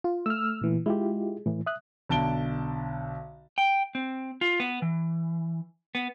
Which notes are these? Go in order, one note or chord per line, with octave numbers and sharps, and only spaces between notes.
F4
A3 E6 F6
A#2 E3
G#3 E4 F4 G4
A2 E3
E5 D#6 F#6
B1 D3 A5 D7 G7
G5
C4
F4
B3
E3
B3